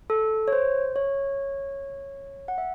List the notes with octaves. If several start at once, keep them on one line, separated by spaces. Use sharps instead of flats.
A4
C#5
C5
C#5
F#5
E5